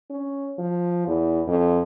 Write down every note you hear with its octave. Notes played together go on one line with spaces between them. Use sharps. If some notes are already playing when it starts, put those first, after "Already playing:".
C#4
F3
E2
F2